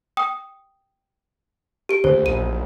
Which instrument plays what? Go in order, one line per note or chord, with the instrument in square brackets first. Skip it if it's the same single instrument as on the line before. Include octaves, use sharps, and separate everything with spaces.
[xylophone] G5 D#6
G4 D7
[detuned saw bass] D2 [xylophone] C5
[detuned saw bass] A#1 [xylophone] D#7